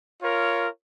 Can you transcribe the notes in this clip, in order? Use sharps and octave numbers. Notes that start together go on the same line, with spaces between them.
F4 A#4 C#5